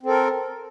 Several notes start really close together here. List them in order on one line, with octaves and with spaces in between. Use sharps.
C4 A4 A#4